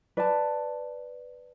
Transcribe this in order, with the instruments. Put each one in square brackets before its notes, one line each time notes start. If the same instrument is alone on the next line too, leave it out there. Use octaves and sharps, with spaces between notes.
[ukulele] B4 D5 A5